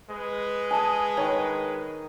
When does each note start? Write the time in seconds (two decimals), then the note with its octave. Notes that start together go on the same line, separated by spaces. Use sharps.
0.10 G#3 B4
0.71 G#4 D#5 G#5 A5
1.17 D#3 C#5